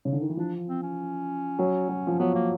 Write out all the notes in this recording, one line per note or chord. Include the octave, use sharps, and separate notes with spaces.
C#3
D3
D#3
E3
F3 D4
C4
C#4
F#3
F#3
F3
F#3 B3
A#3